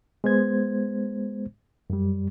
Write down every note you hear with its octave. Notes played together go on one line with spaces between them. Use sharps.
G#3 B3 C5 G#6
F#2 G3